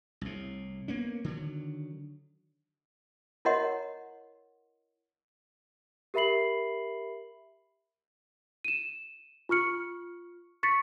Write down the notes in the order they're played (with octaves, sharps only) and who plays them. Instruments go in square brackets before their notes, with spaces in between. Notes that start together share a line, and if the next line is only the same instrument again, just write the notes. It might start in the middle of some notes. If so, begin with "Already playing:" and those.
[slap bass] C2 A2
A#3 B3 C#4
D3 D#3 F#3
[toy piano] E4 A#4 C#5 D#5 F#5 C6
[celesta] G4 A#4 E5 B5 C7 F#7
D#7 E7
F4 C#6 F6 C#7
C#6 A6 B6 C#7